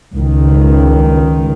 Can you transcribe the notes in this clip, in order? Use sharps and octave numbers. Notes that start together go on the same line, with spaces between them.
C#2 D#3